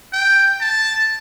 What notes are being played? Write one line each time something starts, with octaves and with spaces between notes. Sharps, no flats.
G5
A5